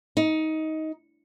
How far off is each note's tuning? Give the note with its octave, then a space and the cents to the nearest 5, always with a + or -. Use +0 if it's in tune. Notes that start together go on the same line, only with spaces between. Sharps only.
D#4 +15